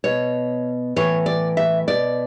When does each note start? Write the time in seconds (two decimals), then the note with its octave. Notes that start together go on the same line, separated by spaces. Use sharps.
0.04 B2 C#5
0.96 A2 E3 C#5
1.26 D5
1.57 E5
1.88 B2 D5